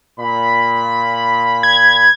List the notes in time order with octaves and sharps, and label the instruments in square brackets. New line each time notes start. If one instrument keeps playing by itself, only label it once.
[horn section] A#2 B5
[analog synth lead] G#6